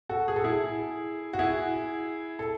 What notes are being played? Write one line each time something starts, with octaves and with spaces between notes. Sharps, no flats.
F#4 A4
G#4
A4
E4 G#4
F#4
E4 G#4
A4